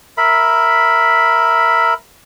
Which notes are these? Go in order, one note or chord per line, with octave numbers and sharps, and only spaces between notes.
A#4 E5 B5